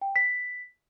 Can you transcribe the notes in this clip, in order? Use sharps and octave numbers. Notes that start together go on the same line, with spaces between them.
G5
B6